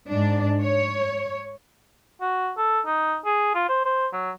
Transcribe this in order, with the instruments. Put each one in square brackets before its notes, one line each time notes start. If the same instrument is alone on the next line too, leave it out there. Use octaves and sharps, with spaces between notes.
[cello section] G#2 D4
C#5
[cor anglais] F#4
A4
D#4
G#4
F4
C5
C5
F#3